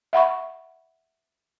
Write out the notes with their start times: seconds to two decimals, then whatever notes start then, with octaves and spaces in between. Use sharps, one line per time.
0.13 E5 F#5 B5 C#6